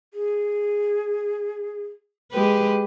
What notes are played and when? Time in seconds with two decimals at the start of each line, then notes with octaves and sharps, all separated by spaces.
0.14 G#4
2.32 G#3 G4 B4